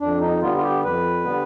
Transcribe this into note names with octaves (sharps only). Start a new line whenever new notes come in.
F2 D4
D#4
D3 G3 B3 F4
F4
G4
F2 B4
D3 G3 B3